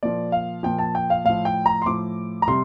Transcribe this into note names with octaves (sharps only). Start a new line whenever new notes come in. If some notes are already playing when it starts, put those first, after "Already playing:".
A#2 F3 D5
F5
A#2 F3 G5
A5
G5
F5
A2 F3 F5
G5
A#5
C6
A2 F3 D6
A#5
C3 G3 C6